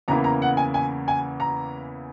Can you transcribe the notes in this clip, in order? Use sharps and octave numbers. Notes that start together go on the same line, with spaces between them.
E2 C#3 E3 A#3 E4 A#5
A#5
F#5
G#5
G#5
G#5
A#5